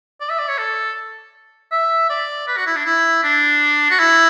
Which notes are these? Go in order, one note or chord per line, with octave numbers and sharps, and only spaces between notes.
D5
E5
D5
C#5
A4
E5
D5
B4
F#4
E4
D4
E4
D4
F#4
E4